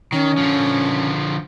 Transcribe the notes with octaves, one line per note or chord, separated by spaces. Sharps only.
D#3 C#4
D3 F3